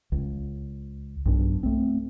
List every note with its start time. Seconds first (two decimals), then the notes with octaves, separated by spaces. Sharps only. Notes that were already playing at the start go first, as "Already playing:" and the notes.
0.12 C#2
1.25 B1 G2 D4
1.63 A3 C4